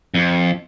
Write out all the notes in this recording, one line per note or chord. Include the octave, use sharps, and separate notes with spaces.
F2